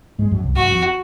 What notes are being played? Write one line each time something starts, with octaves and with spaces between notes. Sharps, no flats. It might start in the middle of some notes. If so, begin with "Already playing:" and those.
G#2 G#3
F#2 F#3
C2 C3
G#2 F#4
F#2
F2